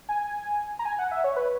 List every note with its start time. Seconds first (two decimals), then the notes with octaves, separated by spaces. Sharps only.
0.09 G#5
0.79 A#5
0.85 G#5
0.99 F#5
1.11 E5
1.24 C#5
1.36 B4